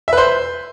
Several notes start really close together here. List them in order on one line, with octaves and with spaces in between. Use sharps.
E5 B4 C5